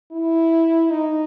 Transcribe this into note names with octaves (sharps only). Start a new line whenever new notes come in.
E4
D#4